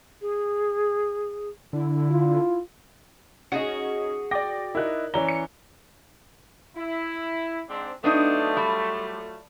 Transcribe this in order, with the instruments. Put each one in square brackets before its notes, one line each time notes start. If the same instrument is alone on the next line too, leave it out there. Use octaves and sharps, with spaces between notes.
[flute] G#4
[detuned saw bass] D3 [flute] E4
[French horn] F4
[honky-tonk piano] C#4 D#4 [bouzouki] F#4 G#4
[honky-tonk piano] D5 A#6 [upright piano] G5 [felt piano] D6
[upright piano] D#4 E4 [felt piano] A#4 F#6
[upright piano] E3 C#4 G7 [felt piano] C#5 D5 A#5
[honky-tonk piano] C#7
[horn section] E4
G#2 C4 D4
[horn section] F#3 A3 F4 [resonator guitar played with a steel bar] B3 D4 D#4
[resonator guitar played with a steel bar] G3